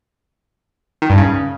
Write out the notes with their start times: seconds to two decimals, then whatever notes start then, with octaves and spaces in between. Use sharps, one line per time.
1.02 D#3
1.10 G2
1.18 C#3